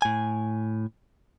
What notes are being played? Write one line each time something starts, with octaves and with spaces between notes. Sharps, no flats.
A2 G#5